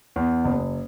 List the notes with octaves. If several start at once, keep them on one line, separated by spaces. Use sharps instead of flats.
E2
F#1